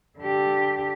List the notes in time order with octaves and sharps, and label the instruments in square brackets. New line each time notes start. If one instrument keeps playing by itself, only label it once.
[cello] D3 G4